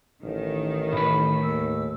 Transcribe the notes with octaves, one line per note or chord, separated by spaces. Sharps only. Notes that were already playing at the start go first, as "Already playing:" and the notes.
A1 D#3
A2 B4 B5
D#2 E6